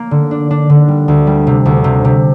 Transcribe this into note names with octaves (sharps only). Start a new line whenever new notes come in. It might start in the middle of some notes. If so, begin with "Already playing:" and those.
Already playing: A#3
D3
D4
D4
D3
G3
D2
G3
C3
D2
C3
C3